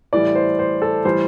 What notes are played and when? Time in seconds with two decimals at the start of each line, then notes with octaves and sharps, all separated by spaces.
0.13 A2 E3 G3 D5
0.35 C5
0.59 C5
0.82 A4
1.05 A2 E3 G3 C5